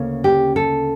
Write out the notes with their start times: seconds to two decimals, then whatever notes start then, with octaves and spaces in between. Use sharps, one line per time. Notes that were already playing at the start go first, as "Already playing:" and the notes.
Already playing: D2 C#3 A#3 C#4
0.24 G4
0.56 A4